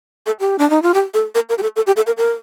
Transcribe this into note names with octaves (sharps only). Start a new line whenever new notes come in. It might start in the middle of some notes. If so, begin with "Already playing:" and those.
A4
G4
D4
D#4
F4
G4
A4
A#4
A#4
G4
A4
A4
G4
A4
A#4
A#4